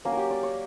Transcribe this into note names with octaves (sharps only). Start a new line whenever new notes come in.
F#3 A#3 C#4
A#4
G4
D5
C#5